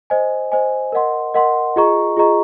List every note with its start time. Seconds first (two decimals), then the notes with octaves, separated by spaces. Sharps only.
0.10 C5 D#5 G#5
0.52 C5 D#5 G#5
0.92 A#4 D#5 F#5 C6
1.34 A#4 D#5 F#5 C6
1.76 F4 G#4 D#5 A#5 C#6
2.17 F4 G#4 D#5 A#5 C#6